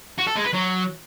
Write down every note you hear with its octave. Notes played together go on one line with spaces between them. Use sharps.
F#4
A4
G#3
B4
F#3